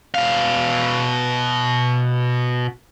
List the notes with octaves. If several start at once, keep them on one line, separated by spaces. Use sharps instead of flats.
B2 F5